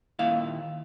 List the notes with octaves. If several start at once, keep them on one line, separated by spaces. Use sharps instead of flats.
D#2 A#2 E4 F5